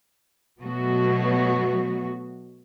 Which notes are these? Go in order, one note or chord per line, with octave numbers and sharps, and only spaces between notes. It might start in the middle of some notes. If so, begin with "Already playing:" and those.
B2 F#3 A3 B3 F#4